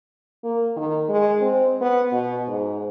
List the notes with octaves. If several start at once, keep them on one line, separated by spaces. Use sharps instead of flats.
A#3
D#3
G#3
C4
B3
B2
G#2